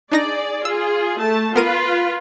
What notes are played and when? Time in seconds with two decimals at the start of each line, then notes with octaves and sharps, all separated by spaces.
0.12 D4 D#4 G#4 D5 A#6
0.65 F4 G#4 E6
1.18 A3 A5
1.56 B3 F4 A#4 B4 D#7